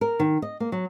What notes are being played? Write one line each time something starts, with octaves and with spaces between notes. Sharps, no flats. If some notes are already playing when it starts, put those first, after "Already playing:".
A#4
D#3
D#5
A#3
F#3